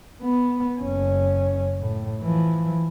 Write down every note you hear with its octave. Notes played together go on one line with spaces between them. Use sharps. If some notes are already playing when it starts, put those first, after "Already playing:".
B3
F#1 C#4
A2
E3 F3